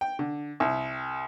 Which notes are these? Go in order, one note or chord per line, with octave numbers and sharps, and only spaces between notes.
G5
D3
C2